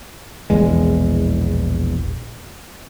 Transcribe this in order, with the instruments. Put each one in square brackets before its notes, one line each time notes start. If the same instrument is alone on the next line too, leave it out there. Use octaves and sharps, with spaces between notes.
[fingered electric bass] E1 A#1 E2 G#3